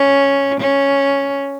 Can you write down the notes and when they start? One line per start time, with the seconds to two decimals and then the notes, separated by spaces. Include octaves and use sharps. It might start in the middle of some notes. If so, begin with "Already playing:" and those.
Already playing: C#4
0.60 C#4